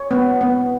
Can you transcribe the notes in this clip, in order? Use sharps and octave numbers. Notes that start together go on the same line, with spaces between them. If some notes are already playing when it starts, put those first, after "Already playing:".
Already playing: C#5
B3
B3